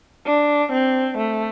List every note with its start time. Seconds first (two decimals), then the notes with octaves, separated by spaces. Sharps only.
0.26 D4
0.72 C4
1.18 A3